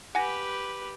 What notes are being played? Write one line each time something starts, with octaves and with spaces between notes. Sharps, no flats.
G4 B4 F#5 G#5 A#6